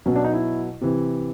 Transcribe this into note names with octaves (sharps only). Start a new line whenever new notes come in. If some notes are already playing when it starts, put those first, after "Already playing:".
B2 F#3 C#4
D4
D#4
E4
C3 E3